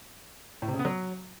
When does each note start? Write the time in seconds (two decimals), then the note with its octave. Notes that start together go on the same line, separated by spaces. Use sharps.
0.62 A2
0.68 C3
0.73 C#3
0.79 B3
0.85 F#3